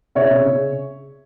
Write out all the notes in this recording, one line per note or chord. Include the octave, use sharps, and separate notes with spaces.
C#3 C#5 E5
C#3
C#3